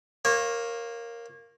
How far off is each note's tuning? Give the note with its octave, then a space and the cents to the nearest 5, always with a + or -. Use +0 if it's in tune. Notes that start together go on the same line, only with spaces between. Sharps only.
A#3 +0 C#5 -30